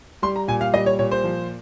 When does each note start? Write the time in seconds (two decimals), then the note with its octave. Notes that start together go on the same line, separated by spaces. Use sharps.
0.23 G3 C6
0.36 A#5
0.48 A#2 G#5
0.61 F5
0.74 G3 D#5
0.86 C#5
0.99 A#2 C#5
1.11 C5
1.24 F3